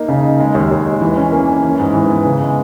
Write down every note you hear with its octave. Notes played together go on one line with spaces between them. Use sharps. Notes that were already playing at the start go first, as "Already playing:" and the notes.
Already playing: A#3 D#4
C#3
D#4
G#3
D#2
D#2
G#3
E3
C#4
A#3
C#4
E3
G#2
E3
B3
C#3
G#3